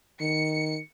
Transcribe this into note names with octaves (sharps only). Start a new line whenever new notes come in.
D#3 C#7